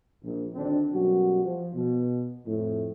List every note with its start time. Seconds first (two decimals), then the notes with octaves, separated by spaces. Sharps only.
0.23 A#1
0.54 D2 D#3 C4 D4
0.93 F#2 B2 F#3 G3 F#4
1.43 F3
1.74 B2
2.46 F2 A2